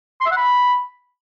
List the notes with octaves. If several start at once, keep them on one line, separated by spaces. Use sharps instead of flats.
C6
E5
F#5
B5